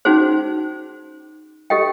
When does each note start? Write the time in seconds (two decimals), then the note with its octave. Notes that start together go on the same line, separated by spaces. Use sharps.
0.05 C#4 D#4 F#4 G#4 C5
1.70 G4 A4 D#5 G5